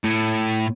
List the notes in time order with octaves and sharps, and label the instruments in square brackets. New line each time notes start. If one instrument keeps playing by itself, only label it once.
[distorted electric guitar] A2